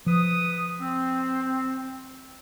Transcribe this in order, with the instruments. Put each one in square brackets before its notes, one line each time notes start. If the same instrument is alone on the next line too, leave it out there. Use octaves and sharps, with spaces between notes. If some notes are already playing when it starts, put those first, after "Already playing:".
[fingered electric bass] F3 [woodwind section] B4 D#6
[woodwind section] C4